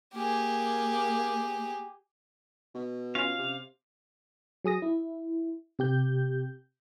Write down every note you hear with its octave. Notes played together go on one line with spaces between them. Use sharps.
A#3 G4 G#4
B2
C#4 F4 F5
C3
F#3 G#4 D#6 A#6
E4
C3 G4 G6